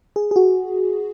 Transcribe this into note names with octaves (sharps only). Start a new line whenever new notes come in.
G#4
G#4
F#4